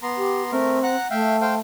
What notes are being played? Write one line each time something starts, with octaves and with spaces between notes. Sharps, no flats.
B3 A#5 C6
G4
A3 C4 A#4
F#5 A#5 F#6
A3 E5 F5 G5
C5 F5 G5